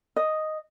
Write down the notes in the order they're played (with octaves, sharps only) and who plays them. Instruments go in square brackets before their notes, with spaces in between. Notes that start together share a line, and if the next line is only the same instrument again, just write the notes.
[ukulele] D#5